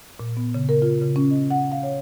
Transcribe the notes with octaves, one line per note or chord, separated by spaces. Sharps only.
A#2
B3
C#3
A#4
F4
C#3
C#4
D#5
F#5
F5
C#5